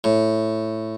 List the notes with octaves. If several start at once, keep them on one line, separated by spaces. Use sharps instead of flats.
A2